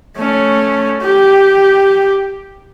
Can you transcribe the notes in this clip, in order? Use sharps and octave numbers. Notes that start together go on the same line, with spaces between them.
A3 C#4
G4